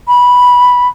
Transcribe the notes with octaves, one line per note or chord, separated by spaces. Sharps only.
B5